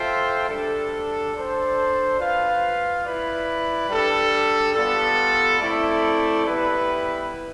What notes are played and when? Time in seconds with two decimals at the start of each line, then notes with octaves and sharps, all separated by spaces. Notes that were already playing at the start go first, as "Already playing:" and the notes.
Already playing: F4 A4 C5 E5 G5
0.48 G3 D4 A4
1.33 D4 A4 C5
2.18 F4 B4 F5
3.04 E4 B4 D5
3.89 G3 D4 A4
4.74 G3 B3 F4 A4
5.59 A3 C4 E4 A4 D5
6.45 G3 B3 E4 B4